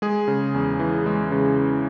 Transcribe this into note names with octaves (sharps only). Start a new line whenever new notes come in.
G#3 G#4
C#3
E2
E3
G#3
C#3